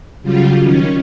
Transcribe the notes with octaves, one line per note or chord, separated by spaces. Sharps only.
C#3 F#3 G3 F4
D#3 C#4